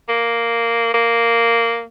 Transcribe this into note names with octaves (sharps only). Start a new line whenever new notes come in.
A#3
A#3